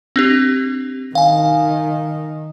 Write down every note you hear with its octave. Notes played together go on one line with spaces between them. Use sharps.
C4 D4 G4
D#3 F5 G#5